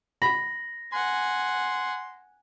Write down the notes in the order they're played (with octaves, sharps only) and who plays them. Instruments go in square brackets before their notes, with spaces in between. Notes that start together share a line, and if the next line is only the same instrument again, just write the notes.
[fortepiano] B5 [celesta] A#6
[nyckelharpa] F#5 G#5 [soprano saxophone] C6